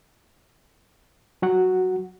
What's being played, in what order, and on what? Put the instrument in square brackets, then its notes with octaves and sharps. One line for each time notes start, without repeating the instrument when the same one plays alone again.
[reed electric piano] F#3 F#4 F#5